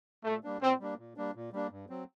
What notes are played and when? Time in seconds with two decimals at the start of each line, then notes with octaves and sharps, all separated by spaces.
0.24 A#2 A3
0.44 G3 A#3 D4
0.61 A#2 C4
0.79 G3 A#3 D4
0.99 A#2
1.17 G3 A#3 D4
1.35 A#2
1.53 G3 A#3 D4
1.71 G2
1.89 F#3 C4